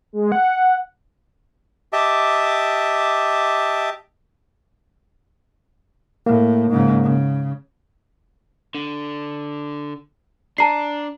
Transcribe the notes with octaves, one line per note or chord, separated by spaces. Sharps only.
G#3
F#5
G4 D#5 E5 A5 D6
A2 A#3
G#2 C#3
C#3
D3
D4 A5 A#5 C7